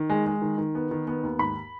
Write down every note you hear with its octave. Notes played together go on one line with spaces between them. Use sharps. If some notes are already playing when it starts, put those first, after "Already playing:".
Already playing: D#3
G#3
G#3
D#3
D#3
B3
D#3
B3
D#2
G#2 B5